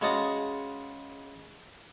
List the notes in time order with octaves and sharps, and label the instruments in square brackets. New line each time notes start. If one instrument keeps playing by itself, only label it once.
[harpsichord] C#3 G#3 F#4 A5 D#6